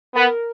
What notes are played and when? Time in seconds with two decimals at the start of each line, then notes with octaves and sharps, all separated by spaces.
0.15 B3 A#4